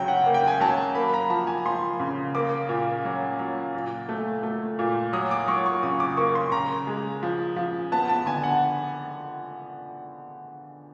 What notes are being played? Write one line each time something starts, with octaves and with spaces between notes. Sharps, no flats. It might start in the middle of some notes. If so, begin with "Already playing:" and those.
Already playing: C#3 F#3 G5
F#5
A#3
G5
G#5
F#3 A5
A#3 B5
A#5
F3 A5
G#5
F3 C6
C#3
A#3 D6
A#2
F#3
F#3
A#2
A3
A3
A#2
F#3 D#6
D6
F#3 C#6
C#6
C#3 D#6
D6
A#3 C#6
C6
C#3 A#5
G#3
F3
F3
B3 A5
A5
D3 G#5
F#5